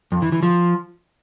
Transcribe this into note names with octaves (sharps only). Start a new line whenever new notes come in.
F2
E3
E3
F3